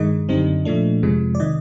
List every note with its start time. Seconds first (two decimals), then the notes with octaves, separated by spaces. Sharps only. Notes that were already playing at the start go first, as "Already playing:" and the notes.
Already playing: G2 D#3 G#3 D#5
0.29 F#2 D3 G3 C4 D#4
0.65 A#2 F3 A3 D4
1.03 F2 C3 F3 G#3
1.35 D5
1.40 C3 D#3 D#5